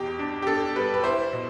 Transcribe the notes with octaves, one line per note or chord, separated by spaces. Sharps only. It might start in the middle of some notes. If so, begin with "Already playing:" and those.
Already playing: E2 B2 G4
D4
G4
D4 A4
G3 B4
B4
E4 C5
B2